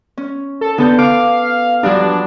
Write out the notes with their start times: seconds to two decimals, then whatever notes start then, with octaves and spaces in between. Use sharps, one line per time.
0.17 C#4
0.61 A4
0.78 D3 B3 A4 G6
0.98 F5 D6
1.83 G2 F3 F#3 D4